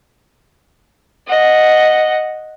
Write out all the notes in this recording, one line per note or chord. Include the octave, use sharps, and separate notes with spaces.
D#5 F#5